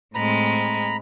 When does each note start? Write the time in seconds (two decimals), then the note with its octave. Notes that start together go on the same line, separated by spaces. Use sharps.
0.15 A2 G#3 C4 A#5 B5